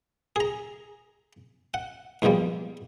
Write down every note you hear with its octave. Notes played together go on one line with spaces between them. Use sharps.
G#4 A#5
F#5
D#2 G#2 B2 F3 G3